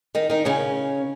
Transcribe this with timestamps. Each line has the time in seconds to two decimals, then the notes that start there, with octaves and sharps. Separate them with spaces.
0.15 D#3 D#4
0.30 D#3 D#4
0.45 C#3 C#4